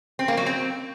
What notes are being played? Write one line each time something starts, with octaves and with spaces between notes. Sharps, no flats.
C4
A#3
F#3
C4